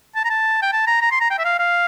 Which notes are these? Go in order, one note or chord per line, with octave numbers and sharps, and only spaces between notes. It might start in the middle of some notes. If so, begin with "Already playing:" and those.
A5
A#5
A5
G5
A5
A#5
A#5
C6
A#5
G5
E5
F5
F5